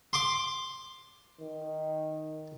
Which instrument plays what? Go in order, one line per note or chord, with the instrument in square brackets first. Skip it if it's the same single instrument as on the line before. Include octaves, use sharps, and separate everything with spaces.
[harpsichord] C6 D6
[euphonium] D#3